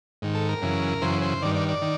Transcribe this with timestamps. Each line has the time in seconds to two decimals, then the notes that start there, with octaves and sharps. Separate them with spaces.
0.22 G#2 D#3
0.35 A4
0.49 A#4
0.62 F#2 C#3 E3
1.02 F#2 C#3 E3 C5
1.22 C5
1.42 G2 D#3 D5
1.55 D5
1.68 D5
1.82 D#3